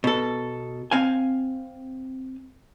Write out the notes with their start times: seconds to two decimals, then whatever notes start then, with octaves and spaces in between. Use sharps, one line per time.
0.04 B2 A4
0.91 C4 F5 G#5